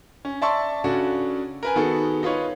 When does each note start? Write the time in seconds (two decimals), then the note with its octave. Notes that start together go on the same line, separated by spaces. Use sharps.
0.25 C#4
0.42 D5 E5 A5 C6 C#6 E6
0.84 C#3 C#4 D4 F#4 A4
1.63 A#4 B4 G#5
1.76 D#3 B3 F#4 G#4 A4
2.23 D#4 F4 B4 C#5